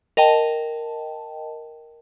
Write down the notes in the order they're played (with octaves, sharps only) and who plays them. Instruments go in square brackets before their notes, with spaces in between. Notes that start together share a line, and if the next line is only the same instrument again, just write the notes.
[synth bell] A#4 D#5 G5 A5